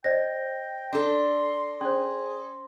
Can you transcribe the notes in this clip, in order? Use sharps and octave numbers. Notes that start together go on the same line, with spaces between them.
C5 D5 D#5 G5 A#6
D4 A4 C6
C#4 G#4 C5 C6